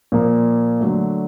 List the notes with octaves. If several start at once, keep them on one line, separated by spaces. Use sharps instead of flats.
A#2 F3 A#3
D3 F#3 A3